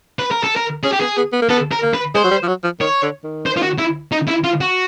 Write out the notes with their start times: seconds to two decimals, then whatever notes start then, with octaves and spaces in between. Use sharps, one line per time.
0.19 B4
0.31 A#4
0.44 A4
0.56 A#4
0.83 C#4 G#4
0.93 G4
1.01 B3 G#4
1.17 B3
1.33 B3
1.42 A#3
1.49 B3 A4
1.72 A#4
1.83 A#3
1.94 B4
2.15 G#3 C5
2.24 F#3
2.31 G3
2.43 F3
2.48 F#3
2.64 F3
2.80 D#3 C#5
3.02 D3
3.24 D#3
3.46 C5
3.57 F4
3.63 F#4
3.78 E4
4.12 D#4
4.28 E4
4.44 F4
4.61 F#4